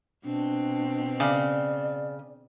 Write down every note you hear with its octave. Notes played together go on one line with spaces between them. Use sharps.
B2 C4 D4
C#3 D5